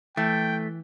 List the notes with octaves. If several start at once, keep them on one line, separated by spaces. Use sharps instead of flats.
E3 A3 G5